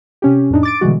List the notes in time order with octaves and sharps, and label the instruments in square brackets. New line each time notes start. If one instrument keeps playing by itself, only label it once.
[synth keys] C3 C#4 G4
F2 A2 D4 D#4
D6 A6 D7
B2 D3 E3 G3 G#3 F#4